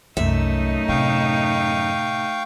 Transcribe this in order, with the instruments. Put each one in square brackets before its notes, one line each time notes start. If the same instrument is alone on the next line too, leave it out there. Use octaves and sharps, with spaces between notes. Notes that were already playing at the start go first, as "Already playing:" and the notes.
[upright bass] C2 [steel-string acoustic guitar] F#2 E5 [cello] A3 D#4
[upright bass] A2 C3 [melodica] F5 G5 C#6